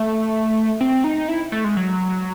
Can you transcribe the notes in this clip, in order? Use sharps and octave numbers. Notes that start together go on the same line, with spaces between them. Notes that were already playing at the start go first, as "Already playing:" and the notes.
Already playing: A3
C4
D#4
E4
A3
G#3
F#3